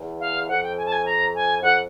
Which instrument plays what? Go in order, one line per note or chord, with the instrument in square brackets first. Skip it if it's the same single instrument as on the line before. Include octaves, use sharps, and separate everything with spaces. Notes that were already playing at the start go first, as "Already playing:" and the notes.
Already playing: [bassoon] E2
[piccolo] F5
[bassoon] F2 [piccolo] F#5
[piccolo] G5
G#5
A5
G#5
A#5
G#5
[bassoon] F2 [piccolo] F#5